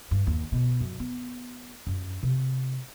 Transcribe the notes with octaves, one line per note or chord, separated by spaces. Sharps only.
G2
D#2
B2
F#2
B3
F#2
C3